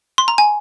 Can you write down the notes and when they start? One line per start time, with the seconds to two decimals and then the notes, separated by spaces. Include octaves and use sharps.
0.18 C6
0.28 A#5
0.38 G#5